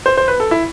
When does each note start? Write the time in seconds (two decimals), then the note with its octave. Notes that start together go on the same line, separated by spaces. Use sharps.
0.06 C5
0.17 C5
0.28 B4
0.40 A4
0.51 E4